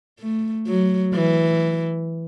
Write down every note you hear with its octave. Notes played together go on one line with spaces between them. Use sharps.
A3
F#3
E3